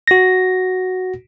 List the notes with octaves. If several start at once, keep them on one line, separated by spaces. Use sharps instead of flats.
F#4 A#6